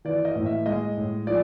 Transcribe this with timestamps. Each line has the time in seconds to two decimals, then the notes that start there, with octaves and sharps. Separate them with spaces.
0.05 E3 D5
0.25 D#5
0.36 A2
0.46 E5
0.66 G#3 D#5
0.97 A2
1.27 F3 D5